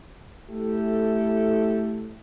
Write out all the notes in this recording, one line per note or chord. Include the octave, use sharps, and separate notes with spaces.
A3 E4 G4 A4